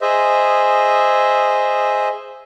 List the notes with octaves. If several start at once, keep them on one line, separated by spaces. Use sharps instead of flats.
G#4 C5 D#5 E5